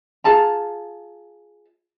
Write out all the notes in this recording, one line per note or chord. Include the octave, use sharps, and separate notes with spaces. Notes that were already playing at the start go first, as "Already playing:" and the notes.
F4 G#4 A5 A#5